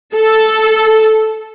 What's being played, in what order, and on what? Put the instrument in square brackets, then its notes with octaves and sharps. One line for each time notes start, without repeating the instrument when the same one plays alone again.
[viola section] A4